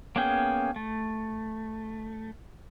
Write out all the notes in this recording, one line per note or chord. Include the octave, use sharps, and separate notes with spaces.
A#3 B3 C#4 G#4 G5
A3